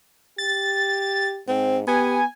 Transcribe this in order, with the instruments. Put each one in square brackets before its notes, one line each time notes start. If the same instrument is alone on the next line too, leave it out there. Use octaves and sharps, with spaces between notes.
[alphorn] G4 [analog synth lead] A6
[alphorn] G#2 [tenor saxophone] C4
[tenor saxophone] B3 [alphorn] G4 [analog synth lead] G#5